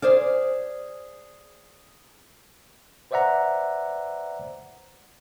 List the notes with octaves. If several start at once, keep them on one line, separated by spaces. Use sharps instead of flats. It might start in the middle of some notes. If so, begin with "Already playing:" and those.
G#4 C5 D5 F5
B4 C5 D5 E5 F#5 A#5